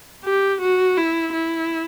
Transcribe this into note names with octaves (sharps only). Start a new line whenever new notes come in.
G4
F#4
E4
E4